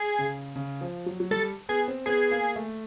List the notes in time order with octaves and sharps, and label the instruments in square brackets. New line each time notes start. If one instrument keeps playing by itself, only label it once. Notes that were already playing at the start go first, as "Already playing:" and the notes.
Already playing: [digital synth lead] G#4
[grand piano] C#3
C#3
F3
F#3
F#3
[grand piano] G3 [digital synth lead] A4
[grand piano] B3 [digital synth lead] G#4
[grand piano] C4
[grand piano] B3 [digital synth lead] G#4
[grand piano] A#3
A3